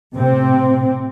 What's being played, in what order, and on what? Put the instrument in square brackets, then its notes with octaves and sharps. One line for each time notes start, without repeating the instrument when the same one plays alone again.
[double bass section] A2 C3 C4